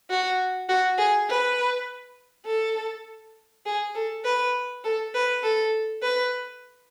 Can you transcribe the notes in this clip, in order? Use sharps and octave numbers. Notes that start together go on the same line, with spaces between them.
F#4
F#4
G#4
B4
A4
G#4
A4
B4
A4
B4
A4
B4